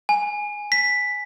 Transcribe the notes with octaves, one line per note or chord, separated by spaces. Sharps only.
G#5
B6